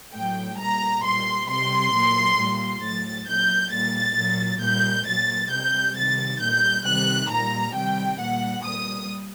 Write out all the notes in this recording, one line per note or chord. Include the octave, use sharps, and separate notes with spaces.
A2 F#3 G5
A#2 G3 A#5
A#2 G3 C6
C3 G3 C6
A#2 F#3
A#2 G3
A2 F#3 A6
A#2 F#3 G6
A#2 G3 A6
A#2 F#3
A#2 G3 G6
A#2 F#3 A6
C3 G3 G6
C3 D#3 G3 A6
A#2 G3 G6
C3 D#3 G3 F#6
A#2 G3 A#5
C3 D#3 G3 G5
A#2 G3 F#5
A#2 G3 D#6